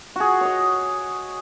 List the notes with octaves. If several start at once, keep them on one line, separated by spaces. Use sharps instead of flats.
F#4 G#4
C#5 D#5